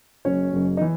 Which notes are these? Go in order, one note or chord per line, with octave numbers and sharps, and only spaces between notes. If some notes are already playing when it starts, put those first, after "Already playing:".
F#1 F#2 C#3 C#4 C#5
F#1 F#2 C#3
D#4
E3